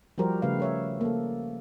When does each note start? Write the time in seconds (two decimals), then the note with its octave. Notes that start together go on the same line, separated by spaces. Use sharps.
0.18 F3 G3 F#4 G4 A#4 C5
0.42 C#3 A3 B4 F5
0.60 A#4 C#5 E5
1.01 A#3 A4